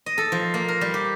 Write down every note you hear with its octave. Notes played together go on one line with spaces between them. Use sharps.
D#5
A4
F3
A#3
A#4
G3
G4